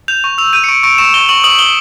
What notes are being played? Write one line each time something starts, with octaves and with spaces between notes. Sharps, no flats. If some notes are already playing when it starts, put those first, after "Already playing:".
G6 F7
C#6
E6 F7
G6 D#7
C#7
C#6 D7
C#6 D7
C#6 E7
C#6 G7
C#6 F#7
D#6 F#7
D#6 G7